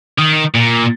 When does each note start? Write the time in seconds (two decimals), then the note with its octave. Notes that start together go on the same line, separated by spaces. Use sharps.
0.18 D#3
0.54 A#2